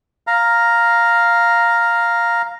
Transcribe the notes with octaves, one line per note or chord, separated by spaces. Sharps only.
F5 A#5